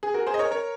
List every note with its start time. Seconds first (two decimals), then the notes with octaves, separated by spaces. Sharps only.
0.03 G#4
0.14 F#4 A#4
0.27 G#4 C5
0.34 D#5
0.39 A#4 C#5
0.51 A#4 C#5